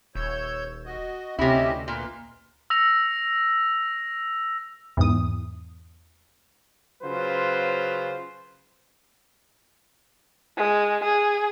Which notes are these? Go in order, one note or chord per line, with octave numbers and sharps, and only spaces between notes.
D#1 C#5 E6 G6
F#4 D#5
D2 C3 C#4 E4 G4 D#5
A#2 B4 C6
E6 A#6 F7
E2 G#2 D#6
C#3 F#3 F4 B4 C5
G#3
G#4